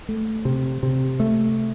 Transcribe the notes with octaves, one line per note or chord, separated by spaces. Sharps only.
A3
C3
C3
A3